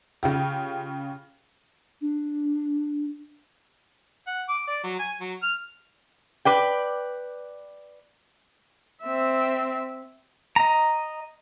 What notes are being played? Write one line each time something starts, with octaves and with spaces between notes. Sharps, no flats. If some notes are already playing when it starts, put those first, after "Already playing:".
C#3 F4 G4
D4
F#5
D6
D5
F#3
G#5
F#3
F6
B4 D5 G5
C4 E5
D#5 A#5